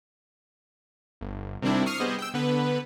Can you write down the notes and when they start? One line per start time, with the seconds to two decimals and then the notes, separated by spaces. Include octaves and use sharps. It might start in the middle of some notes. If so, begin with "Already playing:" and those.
1.21 G1
1.62 C3 D#3 G3 C4 D4 E4
1.86 C#6 D#6 F6 C7
2.00 G3 B3 G#4 C5 D#5
2.19 G5 E6
2.34 D3 B3 B4